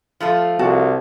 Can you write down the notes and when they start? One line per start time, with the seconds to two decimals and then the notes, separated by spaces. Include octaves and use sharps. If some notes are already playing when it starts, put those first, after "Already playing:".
0.20 F3 A3 F4
0.59 C2 F#4 A5